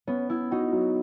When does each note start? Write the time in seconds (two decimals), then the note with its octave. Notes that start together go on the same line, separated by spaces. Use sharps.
0.07 B3 C#4
0.29 C#4 E4
0.51 D#4 F#4
0.72 F#3